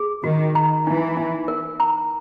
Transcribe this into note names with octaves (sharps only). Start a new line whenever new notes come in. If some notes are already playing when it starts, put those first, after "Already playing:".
Already playing: G#4
D#3 F#4
A#5
E3 D#4
D#4
A#4
A#5